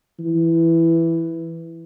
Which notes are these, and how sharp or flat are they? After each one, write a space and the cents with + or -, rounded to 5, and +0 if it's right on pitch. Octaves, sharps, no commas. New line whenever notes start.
E3 +5